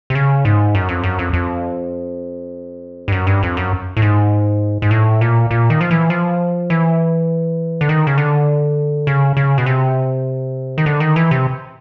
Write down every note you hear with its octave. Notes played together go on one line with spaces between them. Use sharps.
C3
C#3
G#2
F#2
F2
F#2
F2
F2
G2
F#2
G2
F2
F#2
A2
G#2
G#2
A2
A#2
A#2
D#3
F3
E3
F3
E3
D3
D#3
C#3
D3
C#3
C#3
B2
C3
D#3
D3
D#3
E3
C3